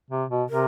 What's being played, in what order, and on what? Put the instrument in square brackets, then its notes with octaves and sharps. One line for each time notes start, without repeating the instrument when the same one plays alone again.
[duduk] C3
B2
[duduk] C3 [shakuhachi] A#4